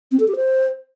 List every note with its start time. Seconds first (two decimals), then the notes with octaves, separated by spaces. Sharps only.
0.12 C4
0.20 A4
0.28 G4
0.36 C5